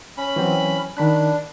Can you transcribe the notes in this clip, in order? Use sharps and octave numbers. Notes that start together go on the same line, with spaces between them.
C#4 B5
E3 F#3 C4
D#3 D4 B5 F#6